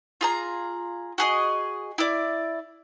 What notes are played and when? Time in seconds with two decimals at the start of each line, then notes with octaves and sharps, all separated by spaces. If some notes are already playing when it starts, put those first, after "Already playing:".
0.21 F4 G#4 A#5
1.18 F#4 G#4 D#5
1.98 E4 D5